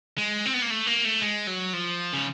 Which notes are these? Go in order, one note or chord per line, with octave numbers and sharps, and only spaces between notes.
G#3
C4
B3
A#3
A3
A#3
A3
G#3
F#3
F3
C#3